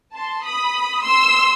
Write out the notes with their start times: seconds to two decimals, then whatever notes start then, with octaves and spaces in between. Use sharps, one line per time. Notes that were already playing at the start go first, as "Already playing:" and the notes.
0.15 A5 C6
0.43 B5 D#6
1.02 C6 E6